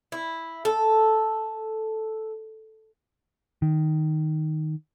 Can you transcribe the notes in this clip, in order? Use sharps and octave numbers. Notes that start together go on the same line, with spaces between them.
E4
A4
D#3